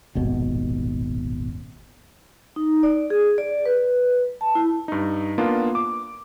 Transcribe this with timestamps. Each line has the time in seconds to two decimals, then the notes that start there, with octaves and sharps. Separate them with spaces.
0.15 D#1 G#1 B2
2.56 D#4
2.83 D5
3.10 G#4
3.38 D5
3.66 B4
4.41 A5
4.55 E4
4.88 G2 D#4
5.38 A#3 B3 D4 F4
5.75 D6